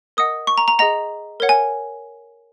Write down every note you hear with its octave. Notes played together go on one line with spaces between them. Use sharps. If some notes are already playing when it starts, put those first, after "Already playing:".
A#4 D#5 F#5 D#6
C#6
A#5
A#5
G#4 D#5 F#5 A#5
A#4 C#5 F#5
G#5